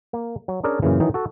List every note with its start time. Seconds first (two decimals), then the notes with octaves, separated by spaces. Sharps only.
0.13 A#3
0.48 F#3
0.63 C#4 D4 G#4 A#4 D5
0.82 F#2 A#2 C#3 E3
1.00 D#3 E3 F#3 D#4
1.14 F#4 A4